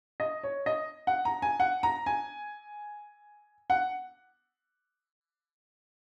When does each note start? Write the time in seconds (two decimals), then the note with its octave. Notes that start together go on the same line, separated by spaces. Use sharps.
0.20 D#5
0.43 C#5
0.66 D#5
1.07 F#5
1.25 A#5
1.42 G#5
1.60 F#5
1.83 A#5
2.06 G#5
3.70 F#5